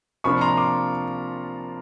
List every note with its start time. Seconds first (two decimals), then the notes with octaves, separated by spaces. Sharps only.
0.24 C3 F3 A#3 D4 F4 B5 C#6
0.41 A#5 C6
0.57 C6 D6